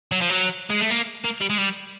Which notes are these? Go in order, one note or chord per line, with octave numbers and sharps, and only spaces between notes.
F#3
F3
F#3
G#3
A3
A#3
A#3
G3
G#3
G3